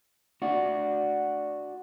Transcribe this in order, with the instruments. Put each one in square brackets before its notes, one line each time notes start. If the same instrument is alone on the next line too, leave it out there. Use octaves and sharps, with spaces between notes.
[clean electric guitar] D4 F#4